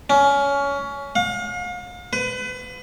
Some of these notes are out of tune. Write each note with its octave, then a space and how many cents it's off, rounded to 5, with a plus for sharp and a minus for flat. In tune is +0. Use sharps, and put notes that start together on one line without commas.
C#4 +20
F5 +40
B4 +30